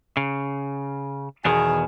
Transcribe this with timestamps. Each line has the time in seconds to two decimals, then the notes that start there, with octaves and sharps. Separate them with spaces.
0.17 C#3
1.45 E2 B2 D#3 G#4